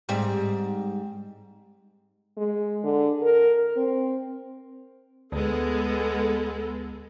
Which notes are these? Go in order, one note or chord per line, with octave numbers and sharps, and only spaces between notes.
G#2 G3 C4
G#3
D3
A#4
C4
D2 G#3 B3 A4